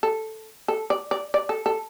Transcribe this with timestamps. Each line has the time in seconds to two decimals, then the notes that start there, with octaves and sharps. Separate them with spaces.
0.03 A4
0.68 A4
0.90 D5
1.11 D5
1.34 D5
1.49 A4
1.66 A4